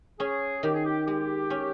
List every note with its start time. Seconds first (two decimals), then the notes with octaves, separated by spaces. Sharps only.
0.20 C#4 G#4
0.63 D#3 G4
0.75 G#4
0.85 G4
1.07 G#3 G4
1.50 C#4